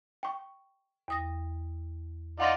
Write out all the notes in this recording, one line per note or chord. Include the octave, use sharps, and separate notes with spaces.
G5 C#6
E2 D#6 A#6
D#4 F4 D5 F#5 C6 A#6